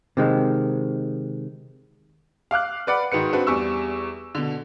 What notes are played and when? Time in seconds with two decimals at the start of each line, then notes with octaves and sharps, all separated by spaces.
0.17 C3 D#3 G#3
2.51 F5 D6 F6 F#6
2.87 B4 D5 F#5 B5
3.12 G#2 D#3 F#4 B4 C#7
3.33 C4 D4 F#4 B4
3.47 E2 G3 C#6 E6
4.35 B2 D3